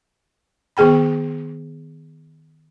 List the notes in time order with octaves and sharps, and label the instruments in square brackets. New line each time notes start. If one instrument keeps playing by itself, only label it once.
[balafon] D#3 B3 G#4 G5 B5